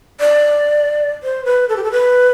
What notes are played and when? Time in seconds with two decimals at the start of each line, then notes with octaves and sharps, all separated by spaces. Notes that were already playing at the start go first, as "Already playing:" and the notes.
0.20 D5
1.23 C5
1.45 B4
1.69 A4
1.76 G4
1.84 A4
1.92 B4